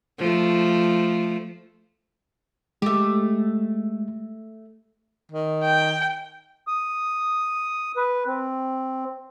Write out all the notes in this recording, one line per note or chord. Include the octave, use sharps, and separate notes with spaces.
F3 A3
G#3 A3 G4
D#3
G5
D#6
B4
C4